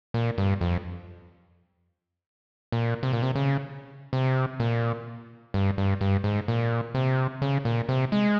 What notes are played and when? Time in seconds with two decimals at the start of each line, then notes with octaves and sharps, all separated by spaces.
0.14 A#2
0.38 G2
0.61 F2
2.72 A#2
3.03 C3
3.13 A#2
3.22 C3
3.35 C#3
4.13 C3
4.60 A#2
5.54 G2
5.78 G2
6.01 G2
6.24 G#2
6.48 A#2
6.94 C3
7.42 C#3
7.65 A#2
7.89 C3
8.12 G#3